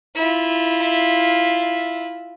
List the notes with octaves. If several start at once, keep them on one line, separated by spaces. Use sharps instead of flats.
E4 F4